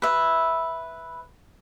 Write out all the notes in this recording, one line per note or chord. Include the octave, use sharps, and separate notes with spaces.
B4 E5